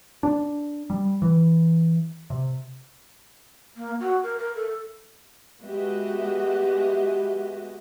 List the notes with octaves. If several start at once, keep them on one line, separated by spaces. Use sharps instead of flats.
D4
G3
E3
C3
A#3
F#4
A#4
A#4
A4
G#3 B3 F#4 G4 D#5 E5